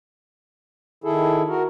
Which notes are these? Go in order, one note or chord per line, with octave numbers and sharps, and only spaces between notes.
D#3 E4 G#4 A4
F#4 A#4